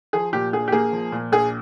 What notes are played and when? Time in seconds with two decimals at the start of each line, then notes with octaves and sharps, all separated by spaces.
0.13 F3 G#4
0.33 A#2 G4
0.53 A#1 G#4
0.68 G4
0.72 A#3 G#4
0.92 F3
1.12 A#2
1.32 A#1 G#4